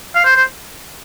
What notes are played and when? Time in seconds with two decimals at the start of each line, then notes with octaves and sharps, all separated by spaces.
0.15 F5
0.24 C5
0.36 C5